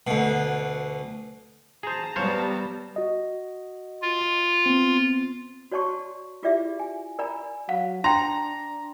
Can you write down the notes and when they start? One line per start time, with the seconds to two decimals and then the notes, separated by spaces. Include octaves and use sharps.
0.07 D2 B2
1.83 G#4 C5 A5 A#5
2.16 G3 B3 C5 C#5 F5
2.96 F#4 D#5
4.02 F4
4.66 B3 C4
5.71 F#4 C#5 D5 A5 C6 C#6
6.43 E4 F4 G4 G#4 D5 E5
6.79 G#5
7.19 A#4 D5 G#5 A#5 B5
7.69 F#3 F5 F#5
8.04 D4 G5 A#5 C6